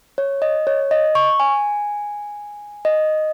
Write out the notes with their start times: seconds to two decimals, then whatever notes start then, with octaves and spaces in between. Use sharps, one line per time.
0.18 C#5
0.42 D#5
0.67 C#5
0.91 D#5
1.15 C#6
1.40 G#5
2.85 D#5